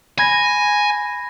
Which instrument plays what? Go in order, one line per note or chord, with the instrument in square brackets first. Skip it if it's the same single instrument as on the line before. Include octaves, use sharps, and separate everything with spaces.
[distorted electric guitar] G#5 [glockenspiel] B5 G#6 A#6